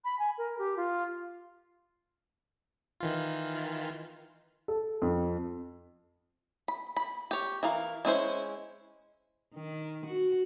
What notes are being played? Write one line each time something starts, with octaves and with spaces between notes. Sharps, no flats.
B5
G#5
A#4
G4
F4
D#3 E3 F4
A4
F2
B5
B5
G4 C#5
E3 A#4 F5
G#3 C#4 E4 C5
D#3
F#4